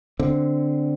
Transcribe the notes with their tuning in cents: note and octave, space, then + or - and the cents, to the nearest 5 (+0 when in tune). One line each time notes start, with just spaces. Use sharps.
D3 +0 C4 -10